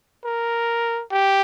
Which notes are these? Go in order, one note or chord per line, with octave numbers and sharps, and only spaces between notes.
A#4
G4